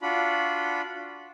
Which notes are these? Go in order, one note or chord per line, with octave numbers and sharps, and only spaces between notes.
D4 F4 F#4 B5